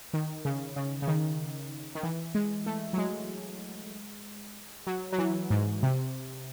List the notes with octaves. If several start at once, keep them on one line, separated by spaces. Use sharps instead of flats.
D#3
C#3
C#3
C#3
D#3
D#3
E3
G#3
A3
F#3
G#3
F#3
F#3
E3
G#2
C3